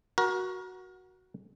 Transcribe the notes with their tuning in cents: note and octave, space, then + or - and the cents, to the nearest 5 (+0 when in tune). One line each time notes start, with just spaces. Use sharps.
F#4 +0 A#4 +30